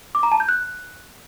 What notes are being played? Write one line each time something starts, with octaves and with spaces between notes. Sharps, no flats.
D6
A#5
A5
G6
F#6